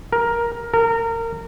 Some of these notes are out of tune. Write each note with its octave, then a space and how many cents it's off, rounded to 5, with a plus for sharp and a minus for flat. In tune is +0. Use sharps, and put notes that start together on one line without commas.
A#4 +10
A#4 -25